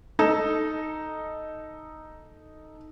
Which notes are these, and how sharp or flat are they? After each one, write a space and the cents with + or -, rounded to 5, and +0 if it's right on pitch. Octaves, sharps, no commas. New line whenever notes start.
D#4 +0 A4 +0